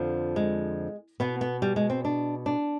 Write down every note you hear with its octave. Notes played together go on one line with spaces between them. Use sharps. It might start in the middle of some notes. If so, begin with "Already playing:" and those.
Already playing: F2 D3 F3
G#3
B2 B3
B3
G3
G#3
C4
D4
D4